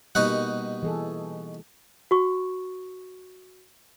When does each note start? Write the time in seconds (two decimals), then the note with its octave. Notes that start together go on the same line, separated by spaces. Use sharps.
0.15 B2 G3 A#3 D#4 F#5
0.83 E3 G#4 A4
2.11 F#4 C#6